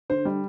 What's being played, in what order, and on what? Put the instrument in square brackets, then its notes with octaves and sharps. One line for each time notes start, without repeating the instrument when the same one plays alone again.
[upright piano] D3 C5
G3